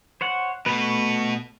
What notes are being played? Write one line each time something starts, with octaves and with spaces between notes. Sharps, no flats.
C5 C#5 F#5
B2 A3 B3 B4